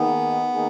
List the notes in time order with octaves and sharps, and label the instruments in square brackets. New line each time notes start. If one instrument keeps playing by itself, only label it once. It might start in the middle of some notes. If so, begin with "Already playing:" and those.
Already playing: [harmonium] D#3 A#3 D#4 G#4 [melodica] B3
[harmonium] D#3 A#3 D#4 G#4